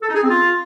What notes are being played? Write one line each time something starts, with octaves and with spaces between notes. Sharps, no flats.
A4
D#4
G#4
C4
F4